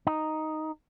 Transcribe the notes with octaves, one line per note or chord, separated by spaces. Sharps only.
D#4